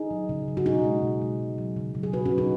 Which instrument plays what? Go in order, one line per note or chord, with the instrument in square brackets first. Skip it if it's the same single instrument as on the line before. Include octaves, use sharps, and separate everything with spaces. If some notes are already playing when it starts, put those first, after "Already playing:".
Already playing: [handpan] D#4 G#4
F#3
C#3
F#3
F#4
B2 D#4 G#4
G#3
B2
G#3
C#3
F#3
C#3
F#3
G#4
B2 F#4 B4
C#4 F#4
F#3
D#4 G#4